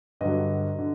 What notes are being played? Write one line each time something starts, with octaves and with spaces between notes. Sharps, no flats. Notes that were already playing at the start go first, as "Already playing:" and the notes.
G2 D3 F#3 D#5
D3